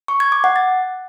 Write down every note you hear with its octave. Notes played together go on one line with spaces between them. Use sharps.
C#6
G#6
D6
F#5
A6